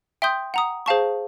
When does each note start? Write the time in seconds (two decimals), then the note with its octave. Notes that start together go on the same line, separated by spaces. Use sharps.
0.22 E5 G5 C6 D#6 G6
0.54 F#5 A#5 D#6
0.86 G#4 C5 F5 A5 C#6